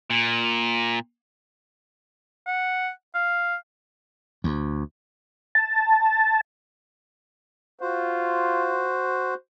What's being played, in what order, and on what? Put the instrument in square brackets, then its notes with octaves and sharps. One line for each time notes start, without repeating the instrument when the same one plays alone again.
[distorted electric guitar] A#2
[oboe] F#5
F5
[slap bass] D2
[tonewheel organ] A5
[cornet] F4 [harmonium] F#4 C5